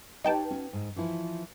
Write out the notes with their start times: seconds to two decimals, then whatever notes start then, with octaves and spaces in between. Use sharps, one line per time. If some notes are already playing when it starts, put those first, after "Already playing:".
0.24 D#4 G4 B4 C#5 G5 A5
0.51 C#4 F#4
0.73 G#2
0.96 E3 F3 E4